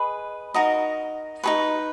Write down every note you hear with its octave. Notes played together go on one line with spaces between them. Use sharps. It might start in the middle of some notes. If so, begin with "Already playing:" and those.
Already playing: G#4 B4 D#5 B5
D#4 F#4 A#4 D#5
D#4 G#4 B4 C#6